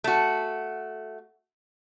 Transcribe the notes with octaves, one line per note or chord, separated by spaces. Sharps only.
A3 F#4